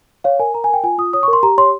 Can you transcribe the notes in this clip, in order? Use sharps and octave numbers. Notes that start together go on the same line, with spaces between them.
C#5 F5
A#4 G#5
A#4 A#5
G#5
A#4 G5
F4 G#5
F4 D#6
C#5 D#6
C#6
A#4
C6
G4 A#5
C#5 C6